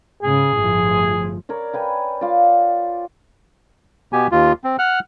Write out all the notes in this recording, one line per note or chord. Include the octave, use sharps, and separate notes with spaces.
G#2 C#3 G#4
G1 A2 F3
A#4 C#5 D5
B4 G5 G#5
F4 D5
B2 B3 G4 G#5
D#2 F4
C4
F#5 F6 F#6